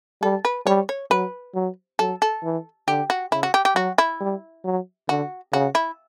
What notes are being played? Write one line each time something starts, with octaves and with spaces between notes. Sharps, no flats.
G3 A4
B4
G3 C#5
C#5
F#3 B4
F#3
F#3 A4
A4
E3
D3 G4
F#4
C#3 E4
F#4
G4
G4
F#3 F#4
E4
G3
F#3
D3 F#4
C#3 F#4
E4